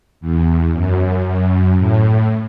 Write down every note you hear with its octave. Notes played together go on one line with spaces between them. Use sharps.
E2
F#2
F#2
A2